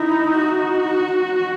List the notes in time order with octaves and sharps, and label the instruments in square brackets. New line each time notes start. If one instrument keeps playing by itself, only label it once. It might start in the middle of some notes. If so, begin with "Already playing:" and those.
Already playing: [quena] D#4 [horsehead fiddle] E4
[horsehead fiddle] F#4